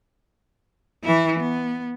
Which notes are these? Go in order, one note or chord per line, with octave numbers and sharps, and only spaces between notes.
E3 E4
B3